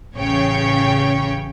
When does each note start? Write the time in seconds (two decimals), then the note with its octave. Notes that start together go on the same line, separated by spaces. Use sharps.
0.15 A1 C#3 C#5 G5